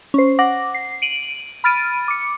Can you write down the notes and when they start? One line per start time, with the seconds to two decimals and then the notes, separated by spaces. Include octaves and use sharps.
0.14 C#4 C5
0.39 F#5 D6 A#6
0.74 C7
1.02 D7 D#7 F#7
1.64 B5 F6 A6 D7 D#7
2.08 D6 C#7